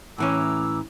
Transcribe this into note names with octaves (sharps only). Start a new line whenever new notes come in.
A2 E3 C#4 A#5 D6 E6